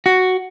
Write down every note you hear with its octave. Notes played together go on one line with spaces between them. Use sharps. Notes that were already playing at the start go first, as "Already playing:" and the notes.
F#4